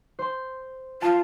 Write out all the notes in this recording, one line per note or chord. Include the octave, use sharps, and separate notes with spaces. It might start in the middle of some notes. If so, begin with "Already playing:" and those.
C5 C6
F4 A5